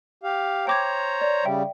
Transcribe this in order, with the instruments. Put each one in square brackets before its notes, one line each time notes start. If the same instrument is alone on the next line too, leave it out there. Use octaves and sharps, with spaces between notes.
[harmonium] G4 F5
[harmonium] C5 C#5 A#5 [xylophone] G5 D6 G#6
[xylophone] D5
[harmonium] C#3 G3 [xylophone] E5 G5